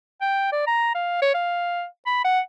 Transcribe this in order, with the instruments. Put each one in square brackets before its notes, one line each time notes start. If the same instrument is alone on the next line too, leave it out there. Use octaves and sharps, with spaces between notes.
[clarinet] G5
D5
A#5
F5
C#5
F5
B5
F#5